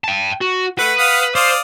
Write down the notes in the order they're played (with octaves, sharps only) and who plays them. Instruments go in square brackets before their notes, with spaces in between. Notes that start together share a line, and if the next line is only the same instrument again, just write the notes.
[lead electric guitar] G5 A5
F#4
[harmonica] A3 F#5 [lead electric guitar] B4
[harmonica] F5 F#5 D#6
[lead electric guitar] C5 [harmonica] D5 F5 D#6